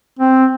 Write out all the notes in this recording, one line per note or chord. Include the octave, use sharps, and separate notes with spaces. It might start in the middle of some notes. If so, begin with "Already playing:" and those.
C4